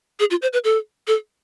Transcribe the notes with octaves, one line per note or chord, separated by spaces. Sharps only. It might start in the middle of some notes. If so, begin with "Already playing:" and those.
G#4
F4
C5
B4
A4
A4